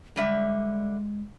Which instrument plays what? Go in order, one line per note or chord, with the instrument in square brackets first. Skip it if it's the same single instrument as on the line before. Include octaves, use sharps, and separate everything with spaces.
[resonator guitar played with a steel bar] D3 G3 E5 [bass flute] G#3